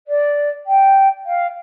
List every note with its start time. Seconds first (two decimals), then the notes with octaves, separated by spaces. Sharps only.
0.07 D5
0.66 G5
1.26 F5